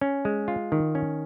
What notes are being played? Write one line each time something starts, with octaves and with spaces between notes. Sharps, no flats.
C#4
G#3
F4
D#3
C#4